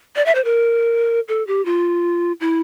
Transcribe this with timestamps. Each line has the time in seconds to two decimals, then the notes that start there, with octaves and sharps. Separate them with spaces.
0.16 D5
0.26 E5
0.35 C5
0.44 A#4
1.28 A4
1.47 G4
1.65 F4
2.40 E4